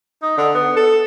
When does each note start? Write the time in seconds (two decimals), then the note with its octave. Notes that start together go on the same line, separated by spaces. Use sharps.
0.22 D#4
0.37 D3
0.55 B3
0.76 A4